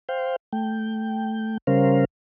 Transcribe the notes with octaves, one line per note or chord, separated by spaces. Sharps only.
C5 F5 G5
A3 G5
C#3 G3 C#4 A#4 C5 F5